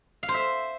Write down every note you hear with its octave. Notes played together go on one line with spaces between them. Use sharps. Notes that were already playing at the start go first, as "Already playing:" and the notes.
F5
C5
E5